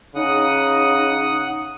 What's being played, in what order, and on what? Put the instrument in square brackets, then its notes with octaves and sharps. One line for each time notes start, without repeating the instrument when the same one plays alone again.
[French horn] C#3 [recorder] D#4 [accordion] F#5 D#6